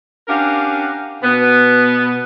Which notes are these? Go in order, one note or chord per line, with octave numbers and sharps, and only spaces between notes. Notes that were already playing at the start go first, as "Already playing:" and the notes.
C#4 D4 G4 A#4 F5 F#5
B2 B3